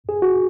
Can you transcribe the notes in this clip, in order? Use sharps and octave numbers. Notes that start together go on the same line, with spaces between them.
G#4
F#4